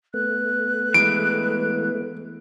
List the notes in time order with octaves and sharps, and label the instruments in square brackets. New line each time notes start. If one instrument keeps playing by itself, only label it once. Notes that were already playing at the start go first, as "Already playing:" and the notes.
[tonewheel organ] A3 B3 [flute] F#6
[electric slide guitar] E3 G#3 [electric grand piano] D7